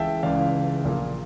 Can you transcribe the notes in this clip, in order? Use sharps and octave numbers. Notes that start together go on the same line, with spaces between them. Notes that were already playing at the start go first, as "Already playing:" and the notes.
Already playing: C#2 C#3 E3 E5 F5 G5 A5
C#2 C#3 E3 D5 F5
A#1 A#2